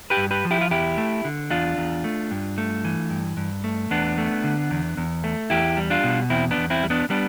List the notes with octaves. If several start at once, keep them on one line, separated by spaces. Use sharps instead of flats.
G4 B4
G2
G4 B4
F3
E4 G4
F4
E2 E4 G4
A3
D3
E2 D4 F4
E2
A3
G2
A3
E3
G2
G2
A3
E2 B3 D4
A3
D3
E2
E2
A3
E2 E4 G4
G3
D4 F4
B2
E2 C4 E4
B3 D4
E2
C4 E4
G3
B3 D4
G3 B3 D4